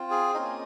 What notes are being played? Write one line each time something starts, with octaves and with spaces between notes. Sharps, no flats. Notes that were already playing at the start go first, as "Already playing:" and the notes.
Already playing: C4 F4
G#4
A#3 C#4 D#4 F4 D#5